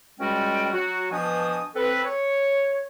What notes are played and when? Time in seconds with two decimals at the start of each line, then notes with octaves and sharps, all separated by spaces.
0.20 C#2 G3 G#3 C#4 F#4 G5
0.72 F#3 F#4
1.12 B2 E3 F3 D4 G#5 D#6
1.76 C4 A4 B4
2.04 C#5